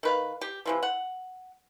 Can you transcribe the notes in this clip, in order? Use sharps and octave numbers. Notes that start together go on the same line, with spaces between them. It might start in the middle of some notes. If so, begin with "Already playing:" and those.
D#3 B4 F5
G4
C3 E3 F3
F#5